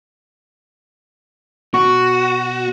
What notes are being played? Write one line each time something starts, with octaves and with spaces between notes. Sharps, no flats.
B2 F#4 C#6